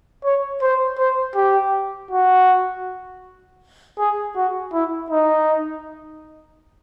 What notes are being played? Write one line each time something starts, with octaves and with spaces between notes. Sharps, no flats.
C#5
C5
C5
G4
F#4
G#4
F#4
E4
D#4